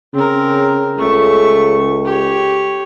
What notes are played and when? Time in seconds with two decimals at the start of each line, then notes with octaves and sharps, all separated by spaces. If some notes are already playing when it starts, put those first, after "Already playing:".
0.14 C#3 C4 A#4
0.98 C#2 A3 C#6
2.05 G4 C#5